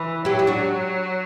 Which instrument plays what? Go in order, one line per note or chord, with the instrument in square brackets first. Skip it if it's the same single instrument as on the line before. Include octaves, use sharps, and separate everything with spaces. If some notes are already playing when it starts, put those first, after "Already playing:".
Already playing: [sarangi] E3
[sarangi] F#3 [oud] E4 G4
[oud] G4
D4 F#4